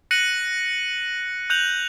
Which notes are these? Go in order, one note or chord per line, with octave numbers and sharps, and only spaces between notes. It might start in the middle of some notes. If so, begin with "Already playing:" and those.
F#6 A#6 C#7 D#7 F#7
F#6 G6 F7 F#7